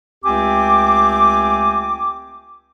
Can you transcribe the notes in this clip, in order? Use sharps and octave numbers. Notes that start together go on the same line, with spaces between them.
C#2 A3 C4 G4 G#5 D6